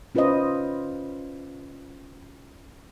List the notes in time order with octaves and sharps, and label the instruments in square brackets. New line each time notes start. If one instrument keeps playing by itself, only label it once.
[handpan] C#4 F4 B4 C5 D#5